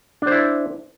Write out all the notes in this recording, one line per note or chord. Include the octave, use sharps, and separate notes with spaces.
D4 E4 C5